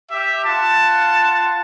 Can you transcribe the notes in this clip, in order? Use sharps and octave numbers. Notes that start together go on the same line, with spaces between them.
G4 E5
F4 F#5 A5